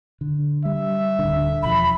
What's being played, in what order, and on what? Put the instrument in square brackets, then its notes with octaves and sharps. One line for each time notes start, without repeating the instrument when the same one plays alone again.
[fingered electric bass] D3
[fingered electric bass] G3 [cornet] E5
[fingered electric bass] D1 G#1 D3
[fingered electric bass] E1 F3 [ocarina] B5